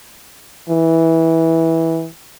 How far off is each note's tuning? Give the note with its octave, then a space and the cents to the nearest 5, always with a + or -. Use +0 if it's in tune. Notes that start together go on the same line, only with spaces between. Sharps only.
E3 -15